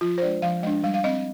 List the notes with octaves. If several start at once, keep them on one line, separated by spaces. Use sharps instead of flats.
F3 F4
C5
G#3 D4 D5
F3 F5
G#3 D4 D#5
G3 F5
F5
C4 D#5